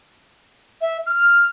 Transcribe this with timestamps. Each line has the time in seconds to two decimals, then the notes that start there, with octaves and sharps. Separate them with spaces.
0.81 E5
1.06 F6